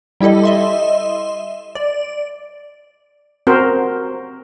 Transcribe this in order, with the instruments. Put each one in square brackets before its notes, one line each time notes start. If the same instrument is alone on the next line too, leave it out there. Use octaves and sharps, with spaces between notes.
[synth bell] G3 E4 G4 A4 D#5
D#5 E5 C6
D5
[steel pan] C4 F#4 A#4 C5